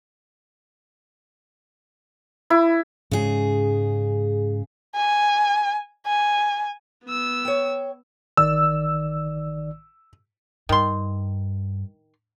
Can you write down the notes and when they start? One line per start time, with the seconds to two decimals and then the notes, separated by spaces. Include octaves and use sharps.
2.50 E4
3.11 G#2 C#3 G#3 C#4 G#4
4.95 G#5
6.07 G#5
7.05 B3 E6
7.45 C#5 G5
8.37 A1 D#3 D5 E6
10.69 G2 D#3 C6